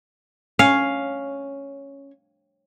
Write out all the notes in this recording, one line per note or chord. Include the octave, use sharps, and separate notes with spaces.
C#4 F5